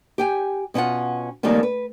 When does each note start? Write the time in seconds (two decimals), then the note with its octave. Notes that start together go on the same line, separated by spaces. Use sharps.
0.18 G4 G5 G#5
0.74 B2 C#4 D#4 F4 F#5
1.43 F2 D#3 G3 A3 A#3 C#4
1.63 B4